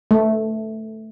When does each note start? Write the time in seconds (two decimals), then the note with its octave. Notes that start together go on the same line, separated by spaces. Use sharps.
0.11 A3